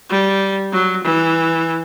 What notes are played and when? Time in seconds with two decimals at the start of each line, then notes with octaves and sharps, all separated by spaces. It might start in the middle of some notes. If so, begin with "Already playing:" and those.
0.10 G3
0.72 F#3
1.05 E3